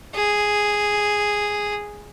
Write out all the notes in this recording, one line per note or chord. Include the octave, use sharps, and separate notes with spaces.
G#4